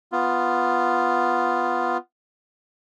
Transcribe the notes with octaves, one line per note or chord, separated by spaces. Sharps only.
B3 F4